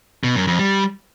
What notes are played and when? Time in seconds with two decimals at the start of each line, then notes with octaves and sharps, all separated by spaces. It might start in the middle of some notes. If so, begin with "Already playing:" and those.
0.24 B2
0.35 F#2
0.47 F2
0.59 G3